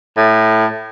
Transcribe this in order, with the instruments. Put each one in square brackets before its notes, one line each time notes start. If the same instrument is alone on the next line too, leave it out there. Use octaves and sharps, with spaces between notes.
[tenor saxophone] A2